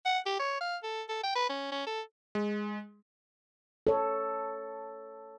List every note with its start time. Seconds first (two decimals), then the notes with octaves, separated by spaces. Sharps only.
0.05 F#5
0.26 G4
0.39 C#5
0.61 F5
0.83 A4
1.09 A4
1.24 G5
1.35 B4
1.49 C#4
1.72 C#4
1.86 A4
2.35 G#3
3.87 A4 C#5